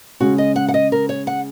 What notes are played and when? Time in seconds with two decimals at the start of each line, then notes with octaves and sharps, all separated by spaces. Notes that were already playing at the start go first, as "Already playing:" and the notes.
0.20 C#3 G#3 C#4 F#4 G#4
0.38 D#5
0.56 F#5
0.68 F#5
0.74 D#5
0.92 A#4
1.09 C#5
1.27 F#5